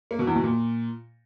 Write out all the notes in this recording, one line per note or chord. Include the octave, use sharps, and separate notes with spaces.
A#3
B2
E2
B2
A#2